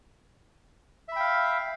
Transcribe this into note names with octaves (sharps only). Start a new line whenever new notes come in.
E5 F5 G5 B5